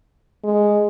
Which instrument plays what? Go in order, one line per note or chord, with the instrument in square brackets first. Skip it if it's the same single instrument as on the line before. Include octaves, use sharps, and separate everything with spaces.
[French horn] G#3